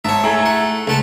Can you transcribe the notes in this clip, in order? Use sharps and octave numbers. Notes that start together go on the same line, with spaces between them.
G#2 C#5 E5 A5
A3 E4 G#4 A#5
F#5
C#2 A3 F#5 A5